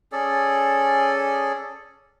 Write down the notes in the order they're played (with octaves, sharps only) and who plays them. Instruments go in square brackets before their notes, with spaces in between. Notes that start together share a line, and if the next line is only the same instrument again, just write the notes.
[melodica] C#4 G#4 A4 D5